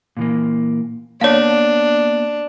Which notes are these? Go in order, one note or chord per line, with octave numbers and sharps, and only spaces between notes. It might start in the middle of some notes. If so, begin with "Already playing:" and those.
A#2 E3 A#3
A#3 B3 D4 C#5 F5 A5